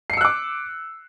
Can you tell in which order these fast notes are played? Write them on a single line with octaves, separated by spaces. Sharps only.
C7 C#7 E6 F#6 D6